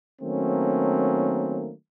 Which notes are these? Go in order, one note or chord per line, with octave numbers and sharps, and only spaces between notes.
D#3 F#3 A3 A#3 C4 C#4